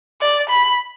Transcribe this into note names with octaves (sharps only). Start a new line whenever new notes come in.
D5
B5